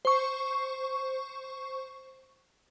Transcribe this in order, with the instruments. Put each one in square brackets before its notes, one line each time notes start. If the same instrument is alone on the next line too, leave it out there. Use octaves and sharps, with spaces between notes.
[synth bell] C5 C#6